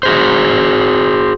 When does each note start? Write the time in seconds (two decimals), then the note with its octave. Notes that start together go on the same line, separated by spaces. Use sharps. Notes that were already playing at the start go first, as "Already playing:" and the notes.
0.03 F#4 G#4 C5